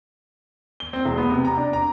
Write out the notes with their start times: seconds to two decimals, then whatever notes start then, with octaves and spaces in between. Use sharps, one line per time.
0.80 G7
0.93 C4
1.05 E1
1.18 B3
1.30 C3
1.45 A#5
1.57 D4
1.73 A#5